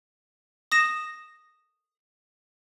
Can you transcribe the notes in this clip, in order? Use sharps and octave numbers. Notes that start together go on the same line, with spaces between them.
D#6 A#6 E7